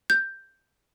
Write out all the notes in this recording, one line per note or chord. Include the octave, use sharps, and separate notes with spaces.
G6